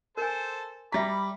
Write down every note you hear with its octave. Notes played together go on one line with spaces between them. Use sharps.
A4 A#4 C5 G#5 A5
G3 E5 A#5 B5 D6 B6